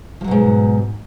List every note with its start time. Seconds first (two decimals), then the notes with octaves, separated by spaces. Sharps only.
0.21 F3
0.24 F#3
0.28 B2
0.31 G#2